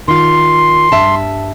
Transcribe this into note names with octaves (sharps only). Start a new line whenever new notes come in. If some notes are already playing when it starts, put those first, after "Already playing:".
D#3 F4 C6
G2 E5 A5